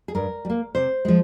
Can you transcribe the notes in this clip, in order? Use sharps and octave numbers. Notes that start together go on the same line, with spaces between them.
G#4
G2 A#4
G3
A#3
C3 C5
F3 G#3